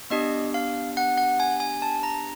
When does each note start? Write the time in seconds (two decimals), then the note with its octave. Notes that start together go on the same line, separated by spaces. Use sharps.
0.10 B3 D4 G4 D#5
0.54 F5
0.97 F#5
1.17 F#5
1.40 G#5
1.60 G#5
1.82 A5
2.03 A#5